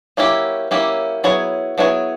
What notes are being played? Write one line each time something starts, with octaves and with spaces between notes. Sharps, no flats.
F#3 A#3 C#4 E4 G4
F#3 A#3 C#4 E4 G4
F#3 B3 E4 G#4 C#5
F#3 B3 E4 G#4 C#5